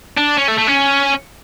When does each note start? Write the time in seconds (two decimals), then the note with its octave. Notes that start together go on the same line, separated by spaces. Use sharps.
0.18 D4
0.38 C#4
0.48 A3
0.58 A3
0.68 C#4